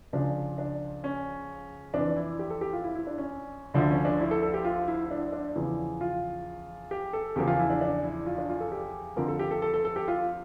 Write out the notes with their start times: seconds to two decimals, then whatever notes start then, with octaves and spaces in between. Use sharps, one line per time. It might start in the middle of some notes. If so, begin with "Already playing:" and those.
0.13 C#2 C#3 F3 D4
0.58 D4
1.04 C#4
1.93 F2 E3 D4
2.16 E4
2.39 G4
2.50 A4
2.61 G4
2.73 F4
2.84 E4
2.95 E4
3.07 D4
3.18 C#4
3.74 D2 D3 F3 D4
3.90 C#4
4.05 D4
4.20 E4
4.31 A4
4.42 A4
4.54 G4
4.65 F4
4.88 E4
5.06 E4
5.11 D4
5.32 D4
5.55 E2 C#3 F3 E4
6.01 F4
6.91 G4
7.13 A4
7.36 E2 C#3 F3 G4
7.47 F4
7.59 E4
7.70 D4
7.81 D4
8.04 E4
8.26 F4
8.38 D4
8.49 F4
8.60 A4
8.72 G4
9.16 F2 D3 F3 A#4
9.28 A4
9.39 G4
9.51 A4
9.62 A4
9.74 A4
9.85 A4
9.96 G4
10.08 F4